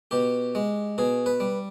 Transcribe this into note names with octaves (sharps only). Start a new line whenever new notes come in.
B2 G4
G#3
B2 G#4
B4
G3